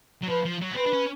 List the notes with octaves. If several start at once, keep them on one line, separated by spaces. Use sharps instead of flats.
F#3
F3 B4
F3
F#3
B3
C4 B4
D4
C#4